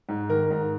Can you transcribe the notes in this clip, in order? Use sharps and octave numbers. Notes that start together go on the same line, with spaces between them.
G#2
D#3 A#4
G#2